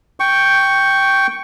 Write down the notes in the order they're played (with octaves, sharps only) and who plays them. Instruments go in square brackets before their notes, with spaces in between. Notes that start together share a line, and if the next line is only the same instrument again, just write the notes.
[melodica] G5 C#6